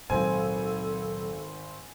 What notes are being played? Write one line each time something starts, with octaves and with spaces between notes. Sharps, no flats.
G#1 C#2 A#2 F#3 C4 A4 G#5